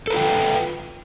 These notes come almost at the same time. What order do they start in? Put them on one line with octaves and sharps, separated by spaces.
A4 B4 F4 G5